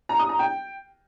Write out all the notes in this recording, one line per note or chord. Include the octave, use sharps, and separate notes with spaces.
A#5
D#6
A#5
G5